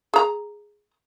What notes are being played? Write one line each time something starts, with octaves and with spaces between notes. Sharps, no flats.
G#4 A#5